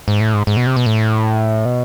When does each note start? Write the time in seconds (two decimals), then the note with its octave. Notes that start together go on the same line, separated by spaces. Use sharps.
0.08 G#2
0.21 A2
0.34 G#2
0.47 G#2
0.57 B2
0.66 C3
0.76 B2
0.86 A2
1.65 B2